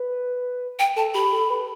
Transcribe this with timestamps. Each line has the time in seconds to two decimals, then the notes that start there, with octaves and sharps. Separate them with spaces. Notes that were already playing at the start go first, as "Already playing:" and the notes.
Already playing: B4
0.79 G5
0.96 A4 A5
1.14 G4 B5
1.33 A4
1.50 B4